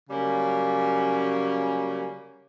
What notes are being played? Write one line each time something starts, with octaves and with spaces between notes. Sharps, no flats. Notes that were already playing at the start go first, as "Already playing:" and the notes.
C#3 F#3 G3 A#3 C#4